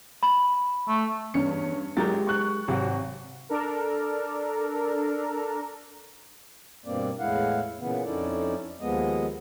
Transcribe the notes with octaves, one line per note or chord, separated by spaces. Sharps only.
B5
A3
E2 G2 C#4 C#7
F#3 G#3 G4 A#4 A6
C#6 F#6
G#1 C3 F#3 F#4
D4 A4 A#4
G2 B2 A#3 C4 D5
E2 A2 G#3 E4 F5 F#5
A#2 C#3 E3 B3
F2 C#4 D#4 E4 A4 D5
D#2 F3 G#3 B3 D#5